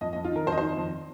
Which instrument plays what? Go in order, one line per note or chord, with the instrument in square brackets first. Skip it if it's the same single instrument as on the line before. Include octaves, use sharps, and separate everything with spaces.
[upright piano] F2 D#5
F2 D#5
F4
D#3 A#4
F2 C5
D#5
D#3 C5
F2